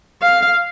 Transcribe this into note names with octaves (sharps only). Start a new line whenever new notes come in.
F5